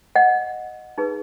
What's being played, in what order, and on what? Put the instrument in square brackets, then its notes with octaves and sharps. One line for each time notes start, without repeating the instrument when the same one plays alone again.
[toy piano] D#5 F#5
D#4 G#4 B4